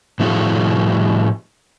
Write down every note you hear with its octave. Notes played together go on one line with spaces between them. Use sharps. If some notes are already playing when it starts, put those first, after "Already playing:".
A2 F3 C#4 E4 F#4 G#4